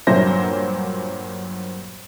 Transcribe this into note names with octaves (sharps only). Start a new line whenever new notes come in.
G2 A#2 F#3 C5 A#6